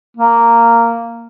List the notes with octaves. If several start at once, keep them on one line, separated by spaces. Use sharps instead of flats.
A#3